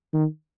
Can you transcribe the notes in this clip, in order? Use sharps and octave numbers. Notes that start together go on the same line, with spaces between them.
D#3